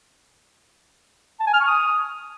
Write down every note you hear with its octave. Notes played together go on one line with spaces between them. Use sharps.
A5
G#5
F6
C#6
D#6